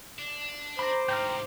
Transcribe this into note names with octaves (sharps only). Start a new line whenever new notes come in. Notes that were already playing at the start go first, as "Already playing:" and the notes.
D4
C5 A#5 B5 D6
D2 G#2 G5 A#5 F6